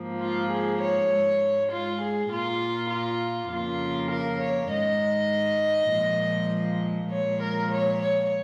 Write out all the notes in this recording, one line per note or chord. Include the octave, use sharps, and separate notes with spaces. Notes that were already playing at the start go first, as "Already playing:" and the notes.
Already playing: G#2 F3 A#3
F4
G#4
C#5
G#2 G#3
F4
G#4
A#2 A#3 F4
F4
F2 C#3 A#3 F4
A#4
C#5
G#2 D#3 G#3 D#5
A#2 F3 G#3
A#2 F3 G#3 C#5
A#4
C#5
C#5